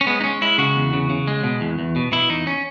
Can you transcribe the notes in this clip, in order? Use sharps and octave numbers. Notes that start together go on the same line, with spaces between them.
C#4
G#3 B3
D#4
G#3 C#4
G#3 E4
C#3 F#4
E2
C#3
C#3
G#3
B2
E2
E2
B2
B2 E4
E2 D#4
C#4